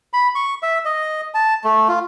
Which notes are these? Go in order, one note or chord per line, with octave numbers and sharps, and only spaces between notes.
B5
C#6
E5
D#5
A5
A3
F4